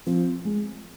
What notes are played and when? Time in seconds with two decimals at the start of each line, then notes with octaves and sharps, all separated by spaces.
0.07 F3 C4
0.45 G#3